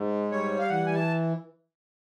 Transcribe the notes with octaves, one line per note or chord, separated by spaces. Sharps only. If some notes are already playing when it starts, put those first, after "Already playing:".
Already playing: G#2
G3 C#5
F5
E3 F#5
G#5
A5